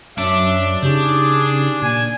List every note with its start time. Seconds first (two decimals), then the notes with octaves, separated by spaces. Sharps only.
0.18 F#2 D4 C#5 E5
0.83 C#3 C#4 D#4 G4 G#4
1.82 A#2 D5 G#5